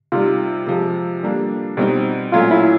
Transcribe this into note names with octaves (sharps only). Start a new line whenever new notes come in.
C3 D#3 G3 F4
C3 F3 G#3
D3 G3 A#3 D4
B2 G3 C4 D#4
A#2 F#3 A3 C#4 F4
E4